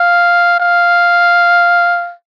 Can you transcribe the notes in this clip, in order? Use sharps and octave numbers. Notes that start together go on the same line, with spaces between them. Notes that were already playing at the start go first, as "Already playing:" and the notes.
Already playing: F5
F5